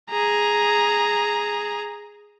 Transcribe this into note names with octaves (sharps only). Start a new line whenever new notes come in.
G#4 A#5